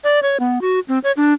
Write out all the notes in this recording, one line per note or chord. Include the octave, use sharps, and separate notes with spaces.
D5
C#5
B3
F#4
C4
C#5
D4